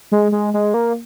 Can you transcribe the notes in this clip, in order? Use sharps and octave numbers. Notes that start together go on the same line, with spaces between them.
G#3
G#3
G#3
A#3